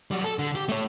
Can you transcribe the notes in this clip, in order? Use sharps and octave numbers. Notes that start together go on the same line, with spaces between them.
F#3 G3
A4
D3
G4
A3 C#5